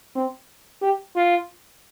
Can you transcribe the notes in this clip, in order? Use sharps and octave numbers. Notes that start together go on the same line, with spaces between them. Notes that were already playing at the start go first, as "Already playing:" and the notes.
C4
G4
F4